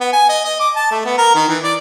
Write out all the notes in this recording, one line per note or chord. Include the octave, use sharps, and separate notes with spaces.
B3
G#5
D#5
D#5
D6
A5
A3
B3
A#4
D#3
E3
D5